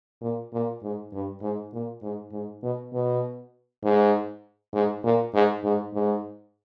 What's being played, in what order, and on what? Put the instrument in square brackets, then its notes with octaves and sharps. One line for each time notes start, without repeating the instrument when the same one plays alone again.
[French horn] A#2
A#2
G#2
G2
G#2
A#2
G#2
G#2
B2
B2
G#2
G#2
A#2
G#2
G#2
G#2